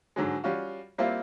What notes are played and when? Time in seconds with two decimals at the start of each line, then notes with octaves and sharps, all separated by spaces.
0.16 G#2 D3 F#3 G#3
0.44 G3 C#4 F4 F#4
0.98 G3 A#3 C4 E4 F4